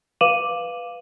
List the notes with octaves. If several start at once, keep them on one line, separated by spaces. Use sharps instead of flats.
B4 F5 D6 D#7 E7 F#7